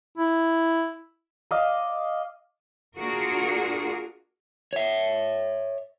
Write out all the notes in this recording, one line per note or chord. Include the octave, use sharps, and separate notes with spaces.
E4
D5 D#5 F5
A#3 D4 F4 F#4 G#4 A#4
C#5 E5